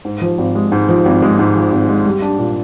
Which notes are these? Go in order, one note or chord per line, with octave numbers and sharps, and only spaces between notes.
G#2
F3
G#1
G#3
G#2
F3
G#1
G#3
G#2
F3
G#1
G#3
G3
D4
A#2